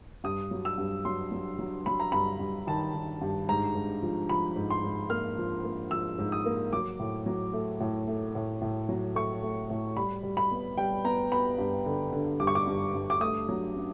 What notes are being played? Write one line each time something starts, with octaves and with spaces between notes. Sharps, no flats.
G2 D#6
F#3
E6
G2
F#3 C6
F#3
F#3
F#3 B5
A#5
G2 B5
G2
D#3 A5
D#3
G2
G#2 A#5
G#2
F3
F3 B5
G#2
C6
G#2
A#3 F6
F3
A#3
F3 E6
G#2
D#6
A#3
F#3 D6
A2
F#3
A3
A2
A3
A2
A2
F#3
A3 C#6
A3
A2
G3 B5
G3
B5
B3
G3 G5
B3 A#5
B3 B5
G2
D3
D3
G2 D6
C#6
D6
G2
G2
D6
A3 D#6
F#3
C#4